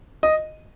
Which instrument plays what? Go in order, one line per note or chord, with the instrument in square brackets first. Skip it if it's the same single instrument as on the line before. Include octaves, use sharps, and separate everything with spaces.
[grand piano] D#5